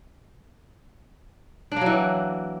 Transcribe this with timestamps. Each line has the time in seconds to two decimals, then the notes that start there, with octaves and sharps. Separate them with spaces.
1.72 D4
1.76 A#3
1.81 F#3
1.86 E3